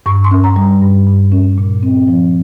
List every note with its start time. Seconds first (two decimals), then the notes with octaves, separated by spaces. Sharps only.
0.06 G2 C#6
0.24 C6
0.31 C#4
0.44 A#5
0.56 G3
0.82 G2
1.07 G2
1.32 C#4
1.58 A#2
1.83 C4
2.08 F3